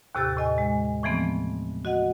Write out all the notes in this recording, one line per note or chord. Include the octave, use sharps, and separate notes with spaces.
D#2 A2 C3 G4 E6 A6
A2 D#5 G#5
G#3
A2 E3 F3 A3 B3 C4
F#4 D#5 F#5